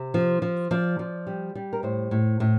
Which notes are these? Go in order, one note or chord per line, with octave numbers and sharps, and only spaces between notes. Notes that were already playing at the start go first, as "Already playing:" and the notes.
Already playing: C3
F3
F3
F3 D5
F3
G3
G3
A#4
A2 C5
A2
A2